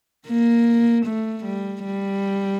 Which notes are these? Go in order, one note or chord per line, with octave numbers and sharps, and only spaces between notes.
A#3
A3
G3
G3